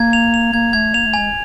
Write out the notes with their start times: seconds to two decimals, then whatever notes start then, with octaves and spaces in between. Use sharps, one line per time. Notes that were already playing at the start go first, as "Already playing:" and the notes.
Already playing: A#3 G#6
0.13 F7
0.34 F7
0.53 A#3 G#6
0.73 A3 G#6
0.94 A#3 F7
1.06 A3
1.14 G#3 G#5